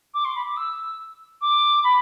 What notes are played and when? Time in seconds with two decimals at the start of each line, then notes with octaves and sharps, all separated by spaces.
0.14 D6
0.24 C6
0.35 B5
0.45 D6
0.56 E6
1.41 D6
1.84 B5